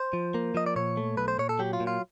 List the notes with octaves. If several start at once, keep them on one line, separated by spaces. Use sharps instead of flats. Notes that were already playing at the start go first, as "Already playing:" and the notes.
Already playing: C5
F3
A#3
F3 D#5
D5
A#2 C#5
A3
B1 B4
C5
A#2 C#5
A4
F#3 G4
F4
A#2
F4